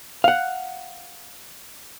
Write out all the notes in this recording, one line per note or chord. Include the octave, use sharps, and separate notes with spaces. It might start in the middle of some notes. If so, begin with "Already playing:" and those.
F5 F#5